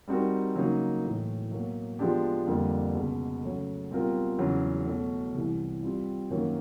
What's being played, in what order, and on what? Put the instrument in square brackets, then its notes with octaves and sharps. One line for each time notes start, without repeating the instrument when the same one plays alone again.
[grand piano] G3 C4 D#4 F#4 A#4
C#3 F#3 A#3 D#4 F#4
A2 E3 A3
B2 F#3 A#3
F3 G#3 B3 D4 G4
F2 D3 G3 A#3
C#2 B2 G#3
C#3 F#3 A3
B2 G3 C4 F4 A#4
E2 C#3 F#3
B2 F#3 A3
C2 C3 E3
G3 C4 F4
F#2 D#3 F#3 A#3